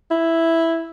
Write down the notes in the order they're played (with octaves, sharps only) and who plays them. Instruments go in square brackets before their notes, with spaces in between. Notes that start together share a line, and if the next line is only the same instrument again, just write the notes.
[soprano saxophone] E4